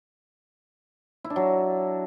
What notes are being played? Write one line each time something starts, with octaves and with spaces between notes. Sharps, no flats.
E4
D4
F#3